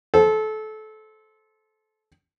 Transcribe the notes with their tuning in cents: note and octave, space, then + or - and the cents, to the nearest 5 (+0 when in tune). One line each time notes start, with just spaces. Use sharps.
A4 -25 C5 +0